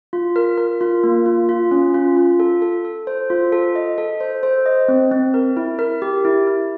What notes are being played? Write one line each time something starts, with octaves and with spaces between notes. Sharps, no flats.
F4
A#4
A#4
F4
A#3
F4
F4
C#4
F4
F4
A4
A4
A4
C5
F4
A4
D#5
A4
C5
C5
D#5
C4
C4
A#4
E4
A#4
G4
E4
E4